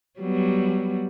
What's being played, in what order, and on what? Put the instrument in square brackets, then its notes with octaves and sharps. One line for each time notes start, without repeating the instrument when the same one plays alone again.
[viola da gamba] F#3 G3 B3